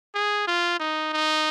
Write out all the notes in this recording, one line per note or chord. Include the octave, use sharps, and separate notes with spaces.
G#4
F4
D#4
D#4